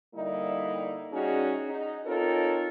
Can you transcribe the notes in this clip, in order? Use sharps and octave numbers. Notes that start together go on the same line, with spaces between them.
D3 G3 A#3 D#4 E4 D#5
G3 C#4 D#4 F#4 G#4
D#4
C4 D#4 F4 A4 A#4 C#5